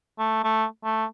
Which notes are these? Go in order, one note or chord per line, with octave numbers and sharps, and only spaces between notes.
A3
A3
A3